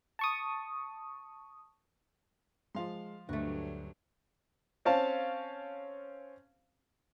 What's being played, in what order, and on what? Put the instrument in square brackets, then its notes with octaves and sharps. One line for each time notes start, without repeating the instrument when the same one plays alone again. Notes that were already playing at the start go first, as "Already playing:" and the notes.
[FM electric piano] A5 C#6 D#6
[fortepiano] F3 F5 C6 [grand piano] G#3
[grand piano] D2 [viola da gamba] G2 F#3 D4 [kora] A3 F#4
[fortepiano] C4 C#4 F5 A5